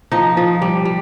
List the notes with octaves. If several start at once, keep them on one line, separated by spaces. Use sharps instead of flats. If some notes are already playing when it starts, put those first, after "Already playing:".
F3 D#4
F3
G3
G3